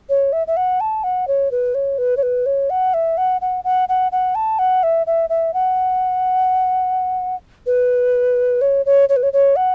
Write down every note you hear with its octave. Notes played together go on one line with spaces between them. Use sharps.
C#5
E5
E5
F#5
A5
F#5
C#5
B4
C#5
B4
C#5
B4
C#5
F#5
E5
F#5
F#5
F#5
F#5
F#5
A5
F#5
E5
E5
E5
F#5
B4
C#5
C#5
C#5
B4
C#5
C#5
F#5